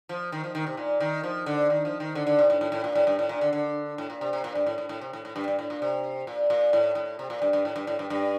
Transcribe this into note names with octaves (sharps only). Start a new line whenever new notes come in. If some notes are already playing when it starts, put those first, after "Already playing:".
F3
D#3
F3
D#3
C3
A#2
D#3
F3
D3
D#3
F3
D#3
D3
D3
C3
A2
A2
A2
A#2
A2
G2
A2
A#2
D3
D3
A2
A#2
C3
C3
A#2
G2
A2
A2
A2
C3
A2
A2
G2
G2
A2
A#2
C3
A#2
A#2
A2
A2
C3
A#2
G2
G2
A2
G2
A2
G2
G2